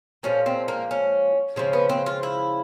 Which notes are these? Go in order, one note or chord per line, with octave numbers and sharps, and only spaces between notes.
A#2 F3 G#3 C#4
C4
A#3
C#4
C#3 F3 G#3 C4
B3
C4
F4
E4